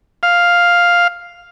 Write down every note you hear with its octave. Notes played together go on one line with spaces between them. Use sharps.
F5